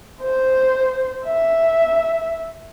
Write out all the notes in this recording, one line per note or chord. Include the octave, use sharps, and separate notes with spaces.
C5
E5